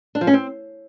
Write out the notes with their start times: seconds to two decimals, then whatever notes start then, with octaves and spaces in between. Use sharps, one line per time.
0.15 D4
0.21 F3
0.27 C#4
0.33 C4